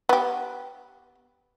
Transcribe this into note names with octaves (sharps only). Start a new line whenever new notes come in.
B3 G4